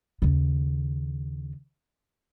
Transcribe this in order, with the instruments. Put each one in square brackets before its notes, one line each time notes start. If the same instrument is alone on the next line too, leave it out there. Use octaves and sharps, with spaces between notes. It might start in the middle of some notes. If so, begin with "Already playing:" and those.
[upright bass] D#2 C#3